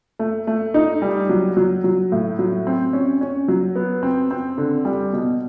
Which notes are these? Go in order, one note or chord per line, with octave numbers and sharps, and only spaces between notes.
A3
A3
D#4
G3
F#3
F#3
F#3
A2
F#3
C4
C#4
C#4
F#3
B3
C4
C4
D3
G3
B2